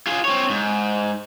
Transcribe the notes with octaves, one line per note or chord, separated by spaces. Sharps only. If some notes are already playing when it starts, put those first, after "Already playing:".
F4 G#4
C4 C#5
G#2